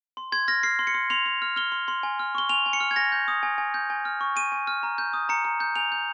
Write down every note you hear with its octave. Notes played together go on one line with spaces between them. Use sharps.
C6
C6 G#6
F6 A#6
F6 C7
C6
C#7
C6
C6 F7
C6
F6
F6 G7
C6
C6
G#5
F6
C#6 G7
G#5 F7
G#5
C#7
F6
G#6
G#5 A#6
G6
D#6
G#5
G#5
G6
G#5
F6
C#6
G#5 D#7
G#5
F6
A#5
G6
D#6
A#5 C#7
A#5
G6
G#5 F7
G6